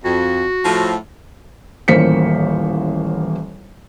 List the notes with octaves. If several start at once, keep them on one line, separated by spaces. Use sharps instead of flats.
F2 F#4
A2 F3
D#1 A1 A#3 C5 B6 C#7